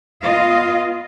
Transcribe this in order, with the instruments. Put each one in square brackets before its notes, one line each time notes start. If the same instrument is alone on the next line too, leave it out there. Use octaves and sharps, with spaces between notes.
[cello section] B3 F4 D#5 F5